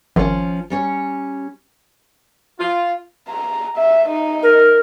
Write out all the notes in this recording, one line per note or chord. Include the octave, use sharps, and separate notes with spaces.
G#1 F3 C#4
G3 C#4 C#5
F4
A#5
E5
D#4
A#4